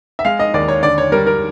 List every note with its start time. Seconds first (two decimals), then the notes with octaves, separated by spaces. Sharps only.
0.19 E5
0.25 G#3 F5
0.39 D#5
0.54 D#2 D5
0.68 C#5
0.83 D3 D5
0.98 C#5
1.12 G3 A#4
1.27 A#4